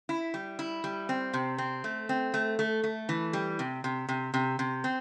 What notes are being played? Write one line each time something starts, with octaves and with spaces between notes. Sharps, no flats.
E4
G3
E4
G3
C4
C3
C4
A3
C4
A3
A3
A3
E3
G3
C3
C3
C3
C3
C3
C4